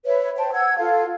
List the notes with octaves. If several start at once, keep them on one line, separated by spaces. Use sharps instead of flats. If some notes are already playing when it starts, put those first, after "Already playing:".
B4 C#5 E5
C5 G5 A5
F#5 E6 G#6
F4 A4 F5